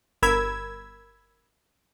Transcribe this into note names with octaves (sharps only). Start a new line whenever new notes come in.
G1 A#4 B5 E6 G#6